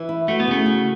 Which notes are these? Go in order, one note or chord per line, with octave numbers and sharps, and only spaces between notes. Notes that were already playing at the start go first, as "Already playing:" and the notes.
Already playing: E3
E4
A3 F#4
B3
C#3 A3
F#4